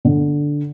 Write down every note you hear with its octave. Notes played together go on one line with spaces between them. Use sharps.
D3